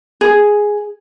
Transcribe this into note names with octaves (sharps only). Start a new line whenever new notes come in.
G#4